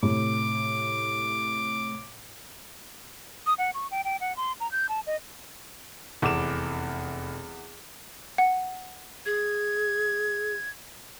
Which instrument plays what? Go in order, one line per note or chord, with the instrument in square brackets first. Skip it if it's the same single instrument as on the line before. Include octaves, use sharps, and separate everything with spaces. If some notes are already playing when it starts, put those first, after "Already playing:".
[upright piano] A2 C3 [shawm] D6
[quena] D#6
F#5
C#6
G5
G5
F#5
C6
A#5
G6
A5
D#5
[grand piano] F1 D6 E7 [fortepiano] E2
[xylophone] F#5
[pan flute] G#4 [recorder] G#6